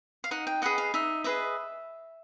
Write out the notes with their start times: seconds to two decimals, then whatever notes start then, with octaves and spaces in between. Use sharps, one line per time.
0.24 F5
0.31 D#4 F#5
0.47 G5
0.62 G#4 B4 D#5 F#5
0.78 F5
0.94 D#4 E5
1.24 G#4 B4 D#5 E5